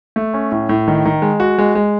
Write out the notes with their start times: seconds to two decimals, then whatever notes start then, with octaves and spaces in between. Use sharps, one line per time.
0.16 A3
0.34 C#4
0.52 A2
0.69 A2
0.88 D#3
1.05 D#3
1.22 G#3
1.40 F#4
1.58 G#3
1.75 G#3